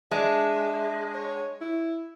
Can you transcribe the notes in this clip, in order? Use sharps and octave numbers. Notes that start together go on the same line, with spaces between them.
G#3 D4 E5
C#5
E4